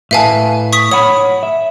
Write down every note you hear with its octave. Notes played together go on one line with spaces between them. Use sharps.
A2 B4 E5 F5 G#5 A5
C#6 D#6 B6
C#5 F#5 B5 D#6
E5